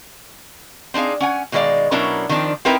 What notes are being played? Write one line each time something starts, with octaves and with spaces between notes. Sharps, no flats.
C4 D4 D#4 G#4 F5
C#4 F#5 G#5
B2 D#3 G#3 A4 D5 F5
B2 F#3 C#4 D4 E4 A#4
D#3 F3 C4 D4
C4 D#4 E4 A#4 B4 G5